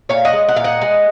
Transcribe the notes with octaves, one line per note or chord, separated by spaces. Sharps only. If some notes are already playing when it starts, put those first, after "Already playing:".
A#2 C#5 F5
D#5 F#5
G#3
F#5
A#2 F5
D#5 F#5
G#3